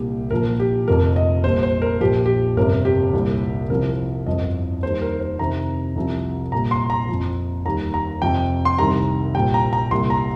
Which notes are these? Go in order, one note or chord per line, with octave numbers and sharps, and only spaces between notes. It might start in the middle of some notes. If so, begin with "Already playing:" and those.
Already playing: C2 A#2 G3 G4
A#1 A#2 F3 A#4
G4
F1 F2 F3 A#4
D#5
A#1 A#2 G3 C5
C5
A#4
A#1 A#2 F3 G4
G4
G1 F2 C3 A#4
G4
C2 A#2 G3
C2 C3 F3 A#4
G1 F2 F3 D#5
D#2 D#3 G3 C5
A#4
C5
F2 C3 D#3 A#5
C2 C3 F3
A#1 A#2 G3 A#5
C6
A#5
F2 F3
D#2 D#3 G3 A#5
A#5
F2 C3 F3 G5
C6
C2 C3 D#3 G3 A#5
A#1 A#2 G3 G5
A#5
A#5
C2 A#2 G3 C6
A#5